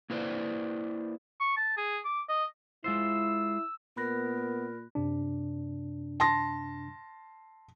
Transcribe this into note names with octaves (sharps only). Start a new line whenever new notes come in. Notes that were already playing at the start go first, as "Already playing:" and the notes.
A#3 E4 B4 C5 D5
C#6
A5
G#4
D6
D#5
G#3 E4 F4 C5 E6
A#2 B3 A#4 B5 F#6 A#6
F#2 C3 D4
A5 C6 A#6